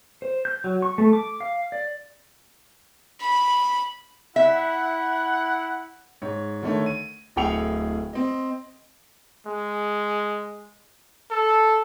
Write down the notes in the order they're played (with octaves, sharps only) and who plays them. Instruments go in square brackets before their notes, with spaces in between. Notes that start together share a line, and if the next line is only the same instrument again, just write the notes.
[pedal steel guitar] C5
G6
F#3
C#6
A3
D6
F5
D5
[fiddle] B5
[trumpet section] E4 F#5 [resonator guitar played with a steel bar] E5
[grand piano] G#2 C#5
D3 D#3 A3 C#5
D#7
D1 A2 G#4 G5 C#7 F7
C4 D#5
[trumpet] G#3
A4